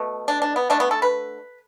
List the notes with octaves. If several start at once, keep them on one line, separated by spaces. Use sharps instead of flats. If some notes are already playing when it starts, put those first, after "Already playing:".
Already playing: B2 A3
D4
D4
B3
D3 A3 D4
B3
A4
B4